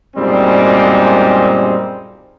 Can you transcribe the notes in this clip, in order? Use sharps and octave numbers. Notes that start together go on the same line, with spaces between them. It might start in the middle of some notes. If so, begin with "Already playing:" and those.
F#2 A#2 G3 G#3 C4 D#4